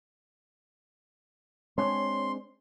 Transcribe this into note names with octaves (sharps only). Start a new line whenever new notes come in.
G#3 C4 D4 C#5 C6